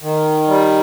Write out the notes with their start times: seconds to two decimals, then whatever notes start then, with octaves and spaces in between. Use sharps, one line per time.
0.02 D#3
0.48 G3